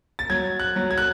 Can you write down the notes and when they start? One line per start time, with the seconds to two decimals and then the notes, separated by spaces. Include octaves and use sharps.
0.19 A6
0.30 F#3 G#6
0.60 F#6
0.76 F#3
0.91 G#6
0.98 F#6